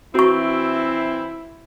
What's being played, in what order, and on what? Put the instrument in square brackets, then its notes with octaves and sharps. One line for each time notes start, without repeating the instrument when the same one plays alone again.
[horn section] E3 C4 [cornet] E4 [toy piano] F#4 C#6